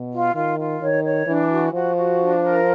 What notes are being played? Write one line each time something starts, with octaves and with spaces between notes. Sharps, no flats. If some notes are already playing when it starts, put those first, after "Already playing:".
Already playing: B2
F4
D#3 F4
F4
D#3 C#5
C#5
E3 D4
F#4
F3 F#4
F#4
D4
A#4